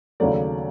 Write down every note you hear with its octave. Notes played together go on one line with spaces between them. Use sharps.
D#2 C#3 F#3 A3 D5